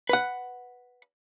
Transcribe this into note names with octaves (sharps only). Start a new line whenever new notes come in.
B4 F#5